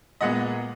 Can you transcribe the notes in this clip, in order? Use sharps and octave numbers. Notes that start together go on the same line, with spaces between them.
A#2 G#3 B3 D#5 F#5